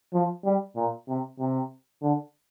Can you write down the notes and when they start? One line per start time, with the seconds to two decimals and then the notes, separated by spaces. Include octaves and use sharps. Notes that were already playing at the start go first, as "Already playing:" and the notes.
0.13 F3
0.45 G3
0.76 A#2
1.08 C3
1.40 C3
2.02 D3